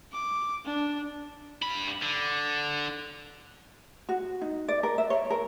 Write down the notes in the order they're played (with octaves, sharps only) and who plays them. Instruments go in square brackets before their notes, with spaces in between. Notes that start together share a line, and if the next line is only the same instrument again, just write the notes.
[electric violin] D6
D4
[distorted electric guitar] G2 B5
D3
[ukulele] F#4
D#4
D5
A#4
E5
C#5
A#4